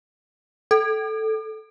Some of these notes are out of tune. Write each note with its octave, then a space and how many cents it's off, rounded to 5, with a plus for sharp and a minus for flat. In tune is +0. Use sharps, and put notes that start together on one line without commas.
A4 -5